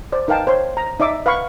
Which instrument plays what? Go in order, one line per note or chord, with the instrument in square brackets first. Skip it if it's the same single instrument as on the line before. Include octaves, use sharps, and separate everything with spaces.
[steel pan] C5 D5
D#4 A#4 B4 F5 G5 A5
C5 C#5 C6
A#5
D#4 D5 E5 D6 E6
B4 F5 F#5 B5 C#6